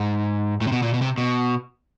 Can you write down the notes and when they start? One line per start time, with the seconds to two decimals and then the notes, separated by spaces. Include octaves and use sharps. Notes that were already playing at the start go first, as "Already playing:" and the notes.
Already playing: G#2
0.61 A2
0.67 C3
0.72 B2
0.82 A#2
0.94 B2
1.02 C3
1.18 B2